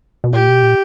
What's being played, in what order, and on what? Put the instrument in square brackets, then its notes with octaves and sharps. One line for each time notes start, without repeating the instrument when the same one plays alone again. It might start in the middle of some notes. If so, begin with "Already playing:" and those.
[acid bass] B2
[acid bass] A#2 [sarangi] G4
[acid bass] B2
A#2